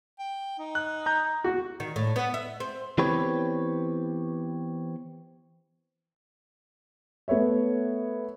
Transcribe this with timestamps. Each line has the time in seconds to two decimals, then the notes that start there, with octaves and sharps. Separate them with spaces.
0.19 G5
0.59 D#4
0.75 F#6
1.06 A#5 G6
1.44 F#4
1.80 D#3
1.96 A2
2.16 B3
2.34 E5
2.60 C4
2.98 E3 B3 C4 G4 B4 C#5
7.28 A3 B3 B4 C#5 E5